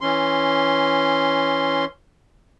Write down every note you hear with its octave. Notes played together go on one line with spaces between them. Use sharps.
E3 C#4 C6